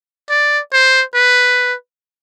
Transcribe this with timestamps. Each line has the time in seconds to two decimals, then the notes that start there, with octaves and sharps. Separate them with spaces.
0.30 D5
0.73 C5
1.15 B4